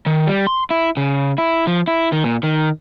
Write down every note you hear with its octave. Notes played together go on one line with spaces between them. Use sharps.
D#3
G3
C6
E4
C#3
E4
F3
E4
D#3
A#2
D#3